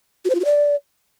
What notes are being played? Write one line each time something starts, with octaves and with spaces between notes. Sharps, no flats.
F#4
C5
F4
F#4
D5